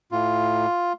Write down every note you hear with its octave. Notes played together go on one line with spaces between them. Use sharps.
A2 F4